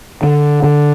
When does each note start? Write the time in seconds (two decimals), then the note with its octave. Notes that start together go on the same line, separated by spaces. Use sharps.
0.23 D3
0.64 D3